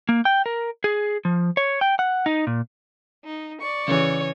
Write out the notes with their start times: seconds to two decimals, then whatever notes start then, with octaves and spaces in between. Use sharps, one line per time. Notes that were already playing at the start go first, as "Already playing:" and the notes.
0.09 A#3
0.25 G5
0.46 A#4
0.84 G#4
1.25 F3
1.57 C#5
1.81 G5
1.99 F#5
2.26 D#4
2.47 A#2
3.24 D#4
3.58 D5 C#6
3.88 C#3 E3 C#5